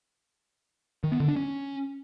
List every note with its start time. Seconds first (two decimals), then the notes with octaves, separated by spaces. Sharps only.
1.04 D#3
1.12 B3
1.20 D3
1.28 D4
1.36 C#4